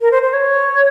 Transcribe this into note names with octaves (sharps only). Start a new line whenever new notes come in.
A#4
C5
C5
C#5